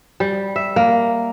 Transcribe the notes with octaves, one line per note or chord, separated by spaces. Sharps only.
G3
E5
A#3